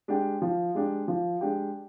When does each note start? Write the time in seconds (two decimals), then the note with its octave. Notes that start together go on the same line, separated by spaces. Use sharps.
0.08 G#3 D4 G4
0.42 F3
0.75 G#3 D4 G4
1.08 F3
1.41 G#3 D4 G4